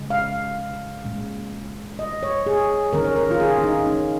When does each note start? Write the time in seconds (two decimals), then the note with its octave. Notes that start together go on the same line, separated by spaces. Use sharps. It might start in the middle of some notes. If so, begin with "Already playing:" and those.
Already playing: C#3 G#3
0.10 F5
1.04 A#2 G#3 C#4
1.99 D#5
2.23 C#5
2.46 G#4
2.93 D#3 C#4 A#4
3.05 C#5
3.16 A#4
3.31 F4
3.40 G#4
3.58 C#4
3.64 D#4
3.86 C#4